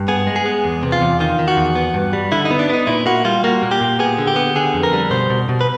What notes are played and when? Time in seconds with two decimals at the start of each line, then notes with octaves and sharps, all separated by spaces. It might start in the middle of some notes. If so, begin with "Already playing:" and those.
Already playing: G2
0.08 B3 G#4
0.27 G#3
0.36 G#4
0.46 B3
0.64 E2
0.83 C3
0.92 F4
1.01 E2
1.20 D#3 F4
1.39 D#3
1.48 F#4
1.57 E2
1.75 B3
1.94 G2
2.13 G3
2.32 D3 E4
2.45 D#4
2.51 B3
2.59 D4
2.69 B3 D#4
2.87 A#2 E4
3.06 A#3 F#4
3.25 G3 F4
3.44 A#3 F#4
3.63 A#2
3.71 G4
3.81 A#2
3.99 B3 G#4
4.18 D3
4.27 G4
4.36 B3
4.56 D3 G#4
4.74 F2
4.83 A#4
4.93 G3
5.11 B2 C5
5.30 B2
5.49 B2
5.61 B4